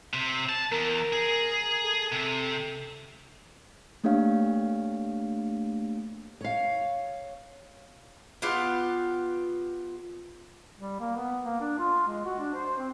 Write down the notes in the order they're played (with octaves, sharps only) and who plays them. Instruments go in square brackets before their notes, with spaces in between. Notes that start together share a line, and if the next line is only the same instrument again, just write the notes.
[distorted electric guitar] C3
A5
[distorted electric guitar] E2 [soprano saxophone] A#4
[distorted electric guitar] G#4
[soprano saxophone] A4
[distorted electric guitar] C3
[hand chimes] A3 A#3 D4 G4 C#5 F5
[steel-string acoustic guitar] C#5 F5
[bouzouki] B3 F4 G4 F#5
[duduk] G3
A#3
B3
A#3
D4
F4
G#3
F#4
D4
C5
C4